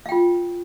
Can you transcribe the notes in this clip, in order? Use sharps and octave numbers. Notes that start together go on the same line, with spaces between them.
F4 F5 G5